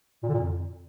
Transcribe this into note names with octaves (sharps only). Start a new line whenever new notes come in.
A#2
D3
A#2
F2